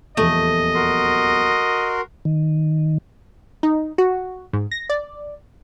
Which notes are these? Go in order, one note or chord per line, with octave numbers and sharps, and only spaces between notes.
D#1 E2 F3 A3 D#5
F#4 A#4 C6
D#3
D#4
F#4
G#2
A#6
D5